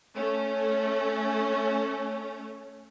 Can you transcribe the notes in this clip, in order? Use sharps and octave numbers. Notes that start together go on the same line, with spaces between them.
A3 C#4